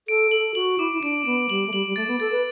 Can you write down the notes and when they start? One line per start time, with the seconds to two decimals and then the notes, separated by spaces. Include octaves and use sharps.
0.08 A4 D7
0.31 A4 F#7
0.55 F#4 F#7
0.78 E4 D6
0.93 E4
1.02 D4 D7
1.25 B3 D7
1.50 G3 F#7
1.67 A3
1.73 G3 F#7
1.87 G3
1.96 A3 A6
2.07 B3
2.20 A4 A6
2.32 B4